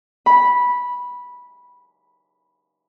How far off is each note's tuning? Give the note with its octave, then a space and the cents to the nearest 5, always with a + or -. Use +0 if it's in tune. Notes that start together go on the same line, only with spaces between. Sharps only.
B5 -10